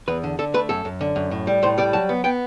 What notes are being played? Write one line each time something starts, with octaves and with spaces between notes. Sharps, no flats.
E2 B4
D3
D3 A4
A3 B4
F#2 A4
F#2
D3
F#2
A2
G3
A2 C5
G3 D5
F#3 A5
B3
B3 G5